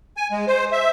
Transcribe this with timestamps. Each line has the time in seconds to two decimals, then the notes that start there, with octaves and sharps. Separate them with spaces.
0.17 G#5
0.31 G#3
0.47 C5
0.72 E5